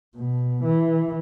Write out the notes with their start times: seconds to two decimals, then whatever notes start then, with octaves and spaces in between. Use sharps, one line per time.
0.16 B2
0.64 E3